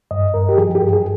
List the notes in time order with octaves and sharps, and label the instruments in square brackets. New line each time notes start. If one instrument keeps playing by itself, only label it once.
[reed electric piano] G2 D#5
G2 A#4
G4
F3 G#4
G4
G2
G#4